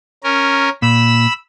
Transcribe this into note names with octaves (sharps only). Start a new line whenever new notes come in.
C#4 A#4
A#2 B5 E6